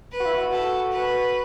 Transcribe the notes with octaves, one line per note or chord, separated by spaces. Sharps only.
B4
F#4
E4
F#4
A4
B4